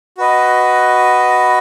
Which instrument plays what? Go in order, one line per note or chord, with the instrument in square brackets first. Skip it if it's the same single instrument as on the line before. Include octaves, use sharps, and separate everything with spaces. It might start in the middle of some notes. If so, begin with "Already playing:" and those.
[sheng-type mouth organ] F#4 B4 D#5